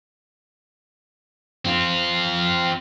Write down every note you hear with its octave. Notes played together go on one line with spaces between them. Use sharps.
C4 F4